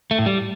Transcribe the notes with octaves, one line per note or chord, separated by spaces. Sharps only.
A3
A2
G3